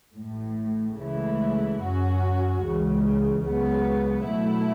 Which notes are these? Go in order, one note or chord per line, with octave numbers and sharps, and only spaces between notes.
A1 A2 A3
C#2 C#3 E3 A3 E4
F#2 F#3 C#4 F#4
C#2 C#3 E3
C#2 C#3 F#3 B3
B2 F#3 A3 E4